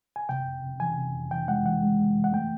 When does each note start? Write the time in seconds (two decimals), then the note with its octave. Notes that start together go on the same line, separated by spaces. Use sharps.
0.16 G#5
0.29 C3 G5
0.46 F2
0.63 C3
0.80 E3 G#5
0.98 C3
1.14 F2
1.31 E3 G5
1.48 G#3 F#5
1.66 E3 F#5
1.82 G#3
1.99 G#3
2.16 E3
2.24 F#5
2.33 A3 G5